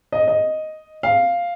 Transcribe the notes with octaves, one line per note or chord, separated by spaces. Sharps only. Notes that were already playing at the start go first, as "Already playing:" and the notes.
D#5
D#5
F5